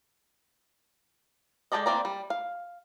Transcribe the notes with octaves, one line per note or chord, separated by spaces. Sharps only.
G#3 G4 A4 D5 D#5
E3 A#3 C4 D5 A#5
G3
F5